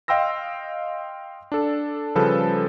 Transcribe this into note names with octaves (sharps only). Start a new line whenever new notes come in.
D#5 F5 G5 C6 E6 A#6
D4 A4
C#3 F3 G3 A4 B4